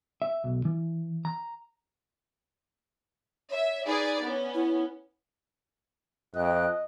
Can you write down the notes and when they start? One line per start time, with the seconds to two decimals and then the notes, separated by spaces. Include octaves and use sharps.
0.22 E5
0.44 B1
0.65 E3
1.25 A#5
3.51 C#5 E5
3.87 D#4 G#4 B4 D5
4.23 B3 C#4
4.54 E4
6.35 F2 D#5 G5 F#6